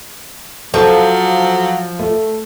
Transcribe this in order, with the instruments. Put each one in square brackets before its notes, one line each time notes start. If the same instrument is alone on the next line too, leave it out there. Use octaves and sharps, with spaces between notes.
[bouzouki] F3 [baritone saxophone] F#3 [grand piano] A4
[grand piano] A3